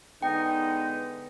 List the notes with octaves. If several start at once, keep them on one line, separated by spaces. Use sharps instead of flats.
D3 G#3 B3 D#4 G5